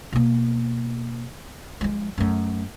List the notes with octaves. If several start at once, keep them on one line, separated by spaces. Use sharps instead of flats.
B2 A#3
F3 G#3
F#2 A3